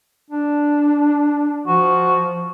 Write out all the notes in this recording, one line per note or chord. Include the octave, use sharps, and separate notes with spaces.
D4
F3 F#4